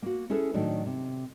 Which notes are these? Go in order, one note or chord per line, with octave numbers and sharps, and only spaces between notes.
A#3 F#4
C#4 E4 G#4 A4 B4
A2 D#3 F#3 A3 D4
C3